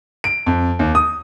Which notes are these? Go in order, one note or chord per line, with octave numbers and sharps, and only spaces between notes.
D7
F2
D#2
D#6